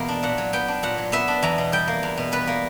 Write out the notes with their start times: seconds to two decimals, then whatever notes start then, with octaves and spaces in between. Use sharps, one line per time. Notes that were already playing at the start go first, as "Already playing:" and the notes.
Already playing: E2 B2 A#3
0.08 D4
0.23 A#2 F#5
0.38 F#3
0.53 B3 G5
0.68 D4
0.83 A#2 F#5
0.98 F#3
1.12 B3 E5
1.28 D4
1.42 E2 A#5
1.58 B2
1.72 G3 G5
1.88 A#3
2.03 E2
2.17 B2
2.32 G3 B4
2.47 A#3